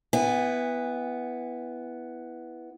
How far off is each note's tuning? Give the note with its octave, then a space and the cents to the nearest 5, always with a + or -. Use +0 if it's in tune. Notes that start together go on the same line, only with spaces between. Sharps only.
B3 +0 E4 +0 G#5 -40